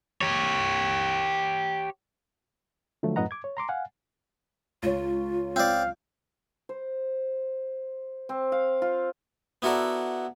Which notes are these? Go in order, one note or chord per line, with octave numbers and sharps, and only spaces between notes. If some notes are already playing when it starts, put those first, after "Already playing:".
G4 C#5
D3 F3 F#3 A3
F#2 A2 B4 D#5 F#5 A#5
D6 G#6
C#5
A#5 C6 D6
F5 F#5 G#5
C#2 F4 C#5
C4 D5 F5
C5
C4
F5
F4
B3 E4 F#4 A4 A#4 D5